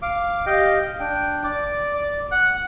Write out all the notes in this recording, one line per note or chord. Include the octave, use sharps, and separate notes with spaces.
F5 D6
G4 D#5 F5 G5
D4 G5
D5 D6
D5
F#5 F#6